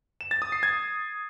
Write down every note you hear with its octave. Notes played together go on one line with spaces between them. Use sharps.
E7
A6
D#6
C7
G#6